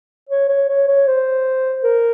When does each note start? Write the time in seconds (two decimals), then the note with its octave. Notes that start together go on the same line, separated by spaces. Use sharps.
0.29 C#5
0.48 C#5
0.69 C#5
0.87 C#5
1.07 C5
1.84 A#4